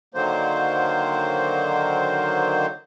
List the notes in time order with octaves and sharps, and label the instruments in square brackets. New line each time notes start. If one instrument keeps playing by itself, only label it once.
[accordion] D3 D#3 F#3 A#3 C5